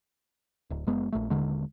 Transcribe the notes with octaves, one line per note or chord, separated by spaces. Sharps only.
D1
F#1 G#3 B3
A#1 A3
D#1 D3 G#3